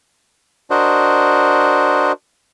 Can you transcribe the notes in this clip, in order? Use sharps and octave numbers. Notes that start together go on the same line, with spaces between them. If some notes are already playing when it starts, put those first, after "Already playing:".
D4 F#4 A#4 C5 D#5